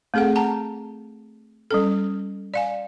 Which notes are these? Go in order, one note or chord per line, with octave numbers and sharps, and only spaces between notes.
A3 C4 G#4 A4 F#5
F#5 A5 A#5
G3 C#4 A4
D5 F5 G#5